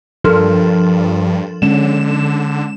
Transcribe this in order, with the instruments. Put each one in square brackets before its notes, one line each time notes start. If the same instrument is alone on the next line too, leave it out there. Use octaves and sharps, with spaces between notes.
[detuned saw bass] G2 [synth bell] F3 [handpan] D4 A4 A#4
[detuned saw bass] D3 [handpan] G#3 C#4 [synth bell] E7